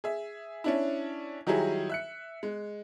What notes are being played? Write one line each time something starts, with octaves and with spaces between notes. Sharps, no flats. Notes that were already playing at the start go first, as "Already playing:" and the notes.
G#4 E5
C#4 D4 E4
D#3 F#3 G3 E4 G#4
E5 F#6 C#7
G#3